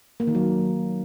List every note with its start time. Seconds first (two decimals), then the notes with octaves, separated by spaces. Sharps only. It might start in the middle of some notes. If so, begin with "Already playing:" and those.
0.20 A#3
0.27 D#3
0.35 F#3